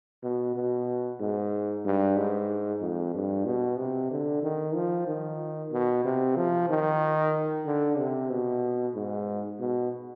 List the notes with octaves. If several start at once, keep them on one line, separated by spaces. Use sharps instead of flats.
B2
B2
G#2
G2
G#2
F2
G2
B2
C3
D3
D#3
F3
D#3
B2
C3
F3
D#3
D3
C3
B2
G#2
B2